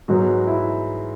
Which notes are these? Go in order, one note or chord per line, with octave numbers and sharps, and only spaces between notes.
G#2 F#3 B3 F#4
E4